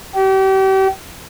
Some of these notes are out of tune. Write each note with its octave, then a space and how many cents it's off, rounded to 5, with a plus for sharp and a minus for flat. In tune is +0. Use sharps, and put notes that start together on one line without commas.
G4 -35